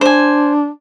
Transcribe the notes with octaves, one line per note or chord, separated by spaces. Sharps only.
D4 C5 G#5